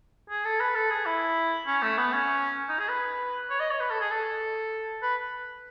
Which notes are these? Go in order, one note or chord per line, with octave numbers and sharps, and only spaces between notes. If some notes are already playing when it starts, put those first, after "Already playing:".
G#4
A4
B4
A4
G#4
E4
C#4
A3
B3
C#4
D#4
G#4
B4
C#5
D#5
C#5
B4
A4
G#4
A4
B4